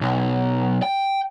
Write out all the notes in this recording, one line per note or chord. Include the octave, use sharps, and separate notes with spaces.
B1
G5